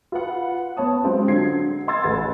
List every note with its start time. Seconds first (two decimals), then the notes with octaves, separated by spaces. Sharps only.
0.12 F4 B4 F#5
0.77 B3 C#5 A5 D#6
1.04 F#3 G#3 C4 F4 C5
1.28 D3 F#3 G#6 C7
1.87 D#5 F#5 C6 E6 G#6 A6
2.04 A1 A4 B4 A6